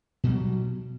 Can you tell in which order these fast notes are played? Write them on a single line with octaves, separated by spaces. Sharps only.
B2 G3 F#3